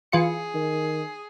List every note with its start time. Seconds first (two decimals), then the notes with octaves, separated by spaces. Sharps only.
0.12 E3 F4 G#4 C#7
0.55 D#3